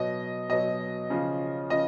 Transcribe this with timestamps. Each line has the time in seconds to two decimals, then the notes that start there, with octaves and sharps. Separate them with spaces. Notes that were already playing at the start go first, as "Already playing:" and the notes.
Already playing: B2 F#3 D#5
0.49 B2 F#3 D#5
1.10 C#3 F3
1.70 C#3 F3 D#5